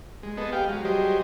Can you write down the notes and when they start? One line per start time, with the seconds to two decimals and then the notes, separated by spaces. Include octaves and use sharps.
0.23 G#3
0.37 B3 G#4 A4 D#5
0.52 G4 F5 G5
0.69 F#3 G#3
0.85 F#3 G3 G4 G#4 C5 D#5